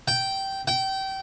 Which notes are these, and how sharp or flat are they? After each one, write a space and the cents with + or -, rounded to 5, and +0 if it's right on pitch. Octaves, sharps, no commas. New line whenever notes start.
G5 -10
G5 -25